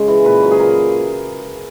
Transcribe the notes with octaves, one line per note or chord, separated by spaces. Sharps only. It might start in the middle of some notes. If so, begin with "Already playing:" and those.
Already playing: C#3 G#3
E3
A#2 B4
F#3
G#4
A#2 A#4